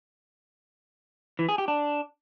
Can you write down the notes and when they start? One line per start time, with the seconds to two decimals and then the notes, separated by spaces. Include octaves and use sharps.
1.39 E3
1.49 G#4
1.58 G4
1.68 D4